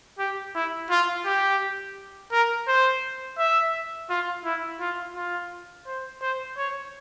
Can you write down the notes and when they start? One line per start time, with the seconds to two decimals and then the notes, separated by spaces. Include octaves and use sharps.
0.19 G4
0.55 E4
0.90 F4
1.26 G4
2.32 A#4
2.68 C5
3.39 E5
4.10 F4
4.45 E4
4.80 F4
5.16 F4
5.87 C5
6.22 C5
6.58 C#5